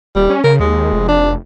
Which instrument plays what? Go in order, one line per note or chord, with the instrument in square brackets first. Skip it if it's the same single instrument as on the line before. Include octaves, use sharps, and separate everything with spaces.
[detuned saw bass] D#1 [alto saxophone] G3
[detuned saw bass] C#4
[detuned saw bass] C#3 [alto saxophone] A#4
[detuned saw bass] D#2 [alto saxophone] G#3
[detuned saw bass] F1
[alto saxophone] D4